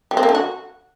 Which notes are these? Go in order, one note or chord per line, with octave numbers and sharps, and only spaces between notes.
G3
C4
A#3
D3
F#4